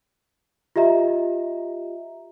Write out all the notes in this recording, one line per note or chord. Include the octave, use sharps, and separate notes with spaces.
F4 G4 D#5 E5 A#5